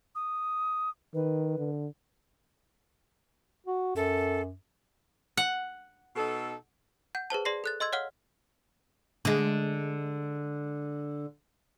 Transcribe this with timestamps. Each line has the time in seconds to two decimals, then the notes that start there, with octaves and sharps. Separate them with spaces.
0.15 D#6
1.14 D#3 B4
1.58 D3
3.66 F#4
3.96 F#2 A4
5.37 F#5
6.16 B2 D#4 A4
7.15 F#5 G6
7.30 G#4 B4 C5 A5
7.45 G#4 D5 C6 A#6 C7
7.64 A4 F#6 A6
7.80 D#5 C6 E6 G#6
7.93 C#5 F5 F#5 F6 G7
9.25 D3 G#3